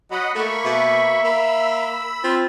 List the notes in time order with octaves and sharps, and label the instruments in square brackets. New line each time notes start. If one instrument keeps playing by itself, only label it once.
[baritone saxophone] F#3 [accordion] D#5 F#5 B5
[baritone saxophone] A3 [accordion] A#3 B5 C#6
[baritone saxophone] B2 [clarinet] E5
[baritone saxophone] A#3 [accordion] B5 E6
[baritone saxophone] C4 [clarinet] F4